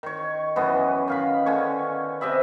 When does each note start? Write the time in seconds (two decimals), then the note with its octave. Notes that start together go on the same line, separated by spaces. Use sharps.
0.03 D#3 C#5
0.56 F#2 E3 B3 D#5
1.08 D#3 F5 B5
1.46 D3 D#3 C#4 C#5
2.21 C3 D#5 E5 B5